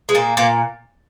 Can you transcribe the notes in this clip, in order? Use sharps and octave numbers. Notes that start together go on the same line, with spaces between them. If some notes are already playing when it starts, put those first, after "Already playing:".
G#3
A#2 A#3
A#2 A#3